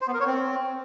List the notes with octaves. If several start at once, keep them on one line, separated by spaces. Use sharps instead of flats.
C5
B3
A#4
C#5
C4